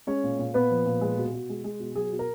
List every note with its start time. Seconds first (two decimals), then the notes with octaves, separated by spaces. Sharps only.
0.07 G#3 C#4 C#5
0.23 A#2
0.39 A#2
0.54 A#2 B3 B4
0.71 F3
0.86 A#2
1.01 G#3
1.18 B2
1.34 B2
1.50 G#3
1.64 G#3
1.80 B2
1.95 F#3 G#4
2.12 B2
2.19 A#4